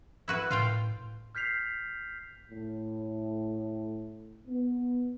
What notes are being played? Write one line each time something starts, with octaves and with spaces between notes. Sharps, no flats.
E4 F#4 B4
A2 F4 F5 G5
F6 G6 B6 C7 F7
A2
B3